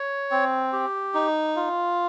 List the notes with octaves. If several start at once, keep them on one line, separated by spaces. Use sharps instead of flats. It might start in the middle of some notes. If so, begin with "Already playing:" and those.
Already playing: C#5
C4
G4
D#4
F4